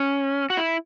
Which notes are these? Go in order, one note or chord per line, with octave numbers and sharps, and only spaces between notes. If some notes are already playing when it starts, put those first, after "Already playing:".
Already playing: C#4
F#4
E4